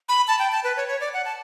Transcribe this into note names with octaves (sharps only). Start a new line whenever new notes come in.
B5
A5
G5
A5
B4
C#5
C#5
D5
F#5
A5